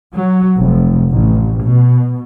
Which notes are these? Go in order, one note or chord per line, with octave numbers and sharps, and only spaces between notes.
F#3
F1
A1
B2